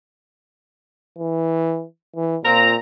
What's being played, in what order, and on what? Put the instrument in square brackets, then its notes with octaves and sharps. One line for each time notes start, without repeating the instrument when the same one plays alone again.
[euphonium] E3
E3
[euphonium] A#2 [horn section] C4 F4 A#5